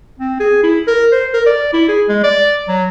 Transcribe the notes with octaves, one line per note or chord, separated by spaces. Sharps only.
C4
G#4
E4
A#4
C5
A#4
D5
E4
G#4
G#3
D5
F#3